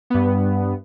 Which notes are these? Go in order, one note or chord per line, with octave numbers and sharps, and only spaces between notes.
G2 B3